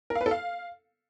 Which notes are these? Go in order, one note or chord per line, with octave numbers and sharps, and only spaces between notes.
A#4
F5
B4
A4
F5